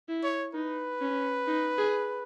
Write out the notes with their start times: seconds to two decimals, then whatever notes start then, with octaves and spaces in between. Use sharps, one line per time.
0.09 E4
0.24 C#5
0.54 D#4 B4
1.01 C#4
1.47 D#4
1.78 G#4